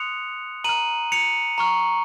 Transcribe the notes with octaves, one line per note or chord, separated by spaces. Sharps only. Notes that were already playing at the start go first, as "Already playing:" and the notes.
Already playing: C6 D#6 F#6 C#7 F7
A#5 F6 D#7 F#7
C#7 F7
A#5 C#6 F6